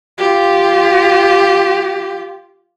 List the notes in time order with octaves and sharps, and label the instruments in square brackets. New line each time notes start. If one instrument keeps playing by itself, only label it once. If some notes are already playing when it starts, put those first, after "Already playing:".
[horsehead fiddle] F4 G4